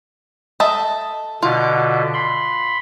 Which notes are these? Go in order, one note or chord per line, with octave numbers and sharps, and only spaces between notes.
A4 D#5 E5
B2 D3 F4
B5 C6